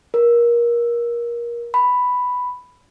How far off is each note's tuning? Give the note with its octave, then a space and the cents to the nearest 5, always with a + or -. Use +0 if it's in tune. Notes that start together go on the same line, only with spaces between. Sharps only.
A#4 +25
B5 +5